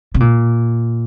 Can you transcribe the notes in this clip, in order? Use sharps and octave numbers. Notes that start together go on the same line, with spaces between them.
C3
A#2